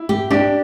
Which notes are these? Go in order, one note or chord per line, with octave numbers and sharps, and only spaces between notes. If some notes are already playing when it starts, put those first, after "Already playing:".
Already playing: E4
G4
D4 G4